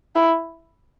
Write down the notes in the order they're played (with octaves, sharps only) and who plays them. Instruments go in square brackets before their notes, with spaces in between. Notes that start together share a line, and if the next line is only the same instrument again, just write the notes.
[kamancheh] E4